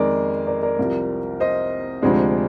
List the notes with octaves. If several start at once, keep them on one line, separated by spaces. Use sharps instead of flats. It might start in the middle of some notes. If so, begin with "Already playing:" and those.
Already playing: F2 D#3 G#3 A#4 D5
A#4 D5
A#4 D5
C2 C3 F3
C5 D#5
D2 C3 F3 G#3 D4